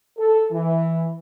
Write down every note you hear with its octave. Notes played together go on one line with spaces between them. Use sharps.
A4
E3